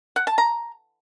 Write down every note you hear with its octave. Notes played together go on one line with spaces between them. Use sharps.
F#5
A5
A#5